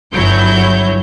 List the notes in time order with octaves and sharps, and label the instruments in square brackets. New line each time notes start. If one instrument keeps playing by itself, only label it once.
[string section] G1 F#3 E4 C#5 G6